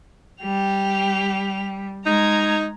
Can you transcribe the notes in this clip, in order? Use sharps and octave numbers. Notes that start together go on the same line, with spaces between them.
G3 G4 F7
G#3 D#4 A#5 G#6